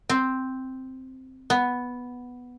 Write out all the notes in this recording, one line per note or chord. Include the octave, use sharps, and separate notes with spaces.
C4
B3